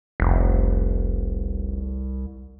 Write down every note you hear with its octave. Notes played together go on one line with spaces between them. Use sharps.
F1 C2